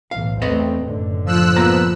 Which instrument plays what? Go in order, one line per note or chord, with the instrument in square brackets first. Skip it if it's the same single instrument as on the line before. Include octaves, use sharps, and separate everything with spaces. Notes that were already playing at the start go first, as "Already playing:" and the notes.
[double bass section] B1 A2 E3 [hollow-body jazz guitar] F5
[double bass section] E2 A3 C4 [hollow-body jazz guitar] B4 C#5 D#5
[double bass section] F#1 A2 D3
[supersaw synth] F3 E6 F#6
[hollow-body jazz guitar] A#3 B3 A#5